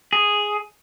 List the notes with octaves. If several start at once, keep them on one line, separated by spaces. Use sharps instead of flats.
G#4